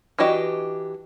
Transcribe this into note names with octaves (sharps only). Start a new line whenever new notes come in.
E3 D4 F#4 G4 D#5